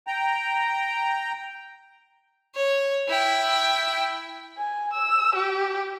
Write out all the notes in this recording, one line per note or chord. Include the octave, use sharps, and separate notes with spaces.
G5 A#5
C#5
E4 G5
G#5
E6
G4